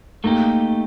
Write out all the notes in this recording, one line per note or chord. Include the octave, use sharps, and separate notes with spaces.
A3 A#3 D#4 G4